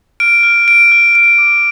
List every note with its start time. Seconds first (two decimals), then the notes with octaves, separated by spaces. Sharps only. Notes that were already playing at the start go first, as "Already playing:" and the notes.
0.20 F6 D7
0.43 F6
0.68 F6 D7
0.92 F6
1.14 F6 D7
1.38 D6